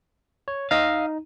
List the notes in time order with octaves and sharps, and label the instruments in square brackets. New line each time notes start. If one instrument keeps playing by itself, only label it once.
[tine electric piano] C#5
[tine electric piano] D#4 [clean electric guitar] D#5 F5